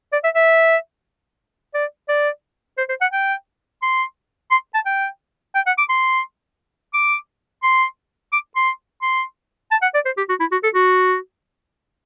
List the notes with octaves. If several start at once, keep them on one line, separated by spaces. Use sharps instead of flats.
D5
E5
E5
D5
D5
C5
C5
F#5
G5
C6
C6
A5
G5
G5
F#5
D6
C6
D6
C6
D6
C6
C6
A5
F#5
D5
C5
G4
F#4
E4
F#4
A4
F#4